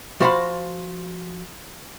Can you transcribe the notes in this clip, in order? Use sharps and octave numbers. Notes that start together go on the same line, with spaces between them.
F3 F#4 C5 E5 F5 B5